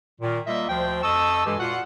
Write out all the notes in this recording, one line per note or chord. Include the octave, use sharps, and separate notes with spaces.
A#2 D#3
G3 A#3 F4 D#5 E5
D2 F3 C5 G5
F2 D#5 A5 C#6 E6
G2 E3 G#3 G4 A4 G#5
A#2 F4 F#4 F#5